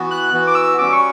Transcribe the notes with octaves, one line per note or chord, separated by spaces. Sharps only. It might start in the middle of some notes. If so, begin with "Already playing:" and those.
Already playing: E3 B3 F#4
F#6
E3 B3 F#4
D6
E6
G3 C#4 F#4 D6
C#6